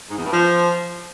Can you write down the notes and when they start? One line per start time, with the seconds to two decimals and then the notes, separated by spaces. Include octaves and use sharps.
0.10 G#2
0.17 E2
0.24 G2
0.32 F3